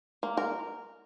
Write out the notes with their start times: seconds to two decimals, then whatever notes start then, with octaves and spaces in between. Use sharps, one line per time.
0.23 A#3
0.37 A#4